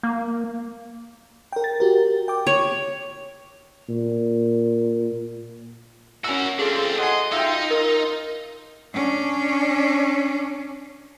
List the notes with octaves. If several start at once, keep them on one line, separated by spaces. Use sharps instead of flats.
A#3
A#4 G5
A6
F#4 G4 A#4
G5 D6
C#5
A#2
C#4 E4 F#4 A#4 E6
C4 D4 F4 G#4 A4
D#5 F#5 G#5 C6
D#4 F4 E5 G5
F4 A#4
C#4 D4